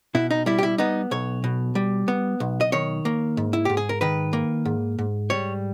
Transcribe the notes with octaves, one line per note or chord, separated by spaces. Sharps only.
B2 E4
D#4
G3 E4
G4
E4
B3 D#4
B1 C#5
B2
G3
B3
B1
D#5
D#3 C#5
A#3
G#2
E4
G#2 G4
G#4
A#4
D#3 B4
A#3
G#2
G#2
G3 C#5